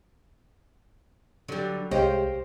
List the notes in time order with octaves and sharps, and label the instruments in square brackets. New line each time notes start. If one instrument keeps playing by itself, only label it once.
[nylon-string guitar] D3 G4 [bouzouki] F#3 G3
[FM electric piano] C2 G#3 C#5 [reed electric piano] G4 [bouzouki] C5 G5 [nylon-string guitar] D#5 F5